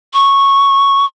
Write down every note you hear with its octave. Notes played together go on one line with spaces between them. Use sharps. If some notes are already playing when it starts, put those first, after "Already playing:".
C#6